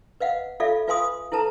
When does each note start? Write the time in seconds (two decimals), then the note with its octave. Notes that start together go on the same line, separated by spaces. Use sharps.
0.20 B4 D#5 F5 F#5
0.60 F4 A4 D5 E5 F5
0.88 F4 B4 F5 G#5 C6 D#6
1.32 E4 A4 B4 A5 A#5